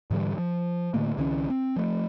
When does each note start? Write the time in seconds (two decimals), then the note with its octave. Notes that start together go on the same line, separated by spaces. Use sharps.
0.11 G#2 D3 E3 G3
0.38 F3
0.94 A2 D3 A3 A#3
1.17 C2 D3 E3 C#4
1.50 C4
1.76 F3 A3